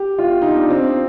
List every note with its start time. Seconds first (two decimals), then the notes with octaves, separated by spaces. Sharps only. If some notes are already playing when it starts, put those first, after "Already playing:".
Already playing: G4
0.19 F4
0.42 D#4
0.55 D4
0.70 C4